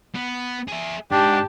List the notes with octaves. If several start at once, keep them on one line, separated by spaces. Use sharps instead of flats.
B3
G#4 E5
G#2 D4 G4 A5